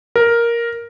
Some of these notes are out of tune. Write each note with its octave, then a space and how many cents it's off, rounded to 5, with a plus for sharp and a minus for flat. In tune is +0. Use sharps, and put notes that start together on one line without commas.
A#4 +5